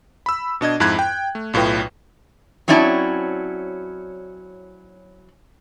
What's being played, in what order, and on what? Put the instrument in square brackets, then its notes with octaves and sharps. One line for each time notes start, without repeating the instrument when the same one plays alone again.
[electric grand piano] B5 E6
B2 D4 D#5 G#6
F2 G#2 E4 B5 F#6 G#6
G5
A3
B1 A2 F4 B4 G5
[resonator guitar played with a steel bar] F#3 C4 C#4 E4 D5 A5